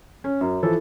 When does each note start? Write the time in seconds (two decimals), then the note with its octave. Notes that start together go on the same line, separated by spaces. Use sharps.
0.24 C#4
0.41 F#2
0.63 E3 F3 A4